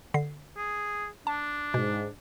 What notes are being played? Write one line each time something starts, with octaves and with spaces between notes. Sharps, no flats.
D3 C7
G#4
D4 A5
G#2 B2